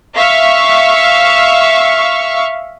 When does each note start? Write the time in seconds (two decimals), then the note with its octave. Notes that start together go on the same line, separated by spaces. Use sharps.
0.15 E5 F5 C#6